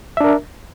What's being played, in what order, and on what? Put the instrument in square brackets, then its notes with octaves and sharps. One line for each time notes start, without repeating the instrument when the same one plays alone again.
[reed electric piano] E5
D4
A#4